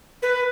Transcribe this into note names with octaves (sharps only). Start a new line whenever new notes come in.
B4